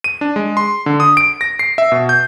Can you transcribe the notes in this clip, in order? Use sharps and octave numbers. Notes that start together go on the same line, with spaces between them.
D#7
D4
G#3
C6
D3
D#6
D7
A#6
C7
E5
B2
G6